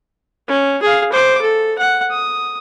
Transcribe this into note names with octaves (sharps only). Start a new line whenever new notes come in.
C#4
G#4 F5
C5 D6
A4
F#5
D#6